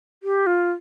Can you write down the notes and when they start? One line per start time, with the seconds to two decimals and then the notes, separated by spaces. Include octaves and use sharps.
0.23 G4
0.46 F4